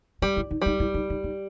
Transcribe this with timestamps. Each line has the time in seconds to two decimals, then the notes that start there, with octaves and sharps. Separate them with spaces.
0.22 G3 C#4
0.37 E4
0.51 D#4
0.62 G3 D#4
0.80 E4
0.94 D#4
1.10 D#4
1.24 D#4